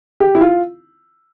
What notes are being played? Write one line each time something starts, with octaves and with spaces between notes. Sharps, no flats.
G4
E4
F4